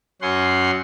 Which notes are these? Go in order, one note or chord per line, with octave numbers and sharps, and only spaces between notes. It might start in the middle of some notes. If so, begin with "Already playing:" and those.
F#2 C#4 F#5 C6